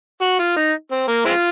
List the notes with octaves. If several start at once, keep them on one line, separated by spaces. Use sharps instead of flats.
F#4
F4
D#4
C4
A#3
G#3 C4 F4